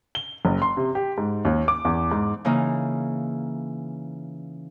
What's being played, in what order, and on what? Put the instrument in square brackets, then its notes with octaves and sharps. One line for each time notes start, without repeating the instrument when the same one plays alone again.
[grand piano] G7
F#1
C6
C3
G4
G#2
D#2
D6
E2
G#2
[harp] C#3 E3 A#3 D#4